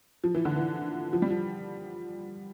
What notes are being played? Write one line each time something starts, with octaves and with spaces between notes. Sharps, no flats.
F3
E3
D3
E3
F3
G3
F3